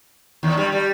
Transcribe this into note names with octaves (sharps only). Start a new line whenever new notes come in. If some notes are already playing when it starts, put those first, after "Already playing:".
D#2 D#3
G2 G3
G3